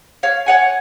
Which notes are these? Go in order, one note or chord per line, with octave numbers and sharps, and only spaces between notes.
C#5 F5
C#5 F#5 G#5